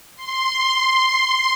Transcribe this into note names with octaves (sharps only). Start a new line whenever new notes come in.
C6